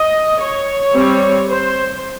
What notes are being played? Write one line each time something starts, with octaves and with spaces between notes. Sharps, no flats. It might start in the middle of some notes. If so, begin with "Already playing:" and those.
Already playing: D#5
C#5
G3 C4
C5